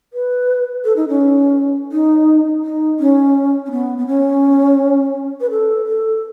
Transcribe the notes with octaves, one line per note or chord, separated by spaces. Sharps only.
B4
A4
D#4
C#4
D#4
D#4
C#4
C#4
B3
B3
C#4
B4
A4
A4